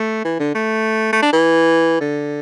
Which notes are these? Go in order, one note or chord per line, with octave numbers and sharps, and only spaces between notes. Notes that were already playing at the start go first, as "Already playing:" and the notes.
Already playing: A3
E3
D3
A3
A3
D4
E3
D3